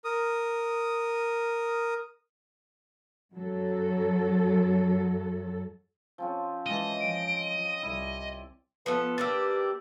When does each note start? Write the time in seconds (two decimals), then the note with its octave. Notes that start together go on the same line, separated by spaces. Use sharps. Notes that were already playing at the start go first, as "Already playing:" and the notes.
0.04 A#4 D#6
3.34 F#2 F#3 A4
6.18 F3 C4 C#4
6.66 E3 G#3 D#5 F5 G#5 A5
7.01 F3 D7
7.44 D#7
7.83 C2 E4 D5
8.86 F3 B3 A4 B4
9.18 A#3 D4 G4 E6 A6